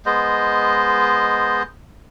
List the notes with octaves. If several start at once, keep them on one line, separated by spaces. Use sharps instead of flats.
G#3 B3 C5 D#5